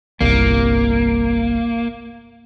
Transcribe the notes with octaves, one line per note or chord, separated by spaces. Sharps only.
G1 C2 G3 A#3